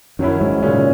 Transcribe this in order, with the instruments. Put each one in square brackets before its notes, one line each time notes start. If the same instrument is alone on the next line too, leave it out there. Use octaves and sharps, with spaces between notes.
[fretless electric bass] F#2 [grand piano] D#3 F#3 C#4 E4
[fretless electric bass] G#2
[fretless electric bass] A#2 [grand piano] C#3 G#3 C#4